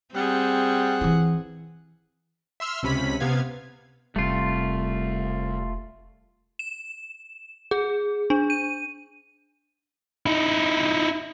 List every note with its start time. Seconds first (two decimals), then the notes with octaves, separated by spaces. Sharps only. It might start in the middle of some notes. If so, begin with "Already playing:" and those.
0.15 G3 C4 G#4 F#5
1.01 E3 E4
2.60 E5 C6 E6 F6
2.83 C#2 C3 C#4 B5 B6
3.20 C3 B3 F5 G#6
4.16 E1 C3 G3 A3 F4
6.59 E7
7.71 G#4
8.30 D4
8.50 D#7
10.26 D#4 E4